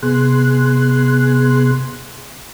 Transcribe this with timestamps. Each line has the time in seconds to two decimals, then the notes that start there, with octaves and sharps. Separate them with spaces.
0.03 C3 B3 G#4 C6 F#6